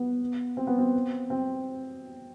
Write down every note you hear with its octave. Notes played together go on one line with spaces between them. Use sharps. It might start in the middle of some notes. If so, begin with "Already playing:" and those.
Already playing: B3
C4
B3
C4
C4